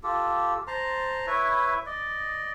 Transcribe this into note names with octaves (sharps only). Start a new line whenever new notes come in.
F4 G4 A4
C5 A5 A#5 C6
E4 B4 C#5 E5
D5 D#5